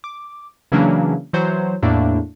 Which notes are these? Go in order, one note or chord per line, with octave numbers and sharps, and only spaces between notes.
D6
C#3 E3 F#3 A#3 C#4 D4
E3 F#3 C5 C#5
E2 A2 A3 A#3 D4